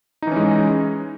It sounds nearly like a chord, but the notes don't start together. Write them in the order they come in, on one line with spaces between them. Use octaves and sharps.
D#4 E3 C#4 G#3